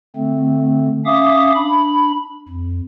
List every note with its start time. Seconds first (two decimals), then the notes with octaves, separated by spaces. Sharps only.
0.16 D3 A3 C4
1.05 C#4 E5 F5 D6 D#6
1.55 D4 B5
2.49 F2